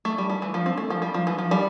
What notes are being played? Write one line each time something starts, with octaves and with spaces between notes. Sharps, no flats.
A3
G3
G3
E3
F3
C4
A3
F3
G3
F3
E3
F3
G3